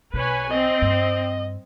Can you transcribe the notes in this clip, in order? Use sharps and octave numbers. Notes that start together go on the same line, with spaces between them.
B1 B2 B4 C#5 G#5
C4 D#5
G2